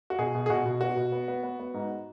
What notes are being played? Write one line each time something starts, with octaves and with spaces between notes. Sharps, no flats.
F#4
B2 G#4
B2
G#4
B2 F#4
B2
B3 F#4
B2
B3
B3
B3
B3
G#2